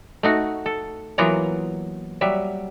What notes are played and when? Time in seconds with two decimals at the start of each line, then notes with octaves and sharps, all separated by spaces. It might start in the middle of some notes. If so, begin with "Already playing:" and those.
0.23 A3 D#4 F#4
0.66 A4
1.18 E3 F#3 A#3 B3 F4 A#5
2.21 F#3 G3 E5